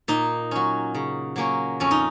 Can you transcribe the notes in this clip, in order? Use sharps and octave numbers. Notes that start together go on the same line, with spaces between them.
A#2 D#4
F#3 C#4
C#3
F#3 A#3 C#4
F2 C#4
D#4